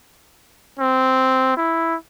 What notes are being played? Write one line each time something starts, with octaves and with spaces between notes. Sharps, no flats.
C4
E4